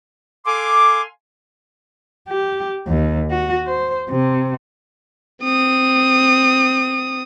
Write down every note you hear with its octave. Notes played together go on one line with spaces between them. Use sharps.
A4 F5 G#5 C6 D6
G4
D#2
F#4
C5
C3
C4 D#6